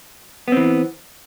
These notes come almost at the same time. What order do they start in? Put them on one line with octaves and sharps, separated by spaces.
B3 C4 E3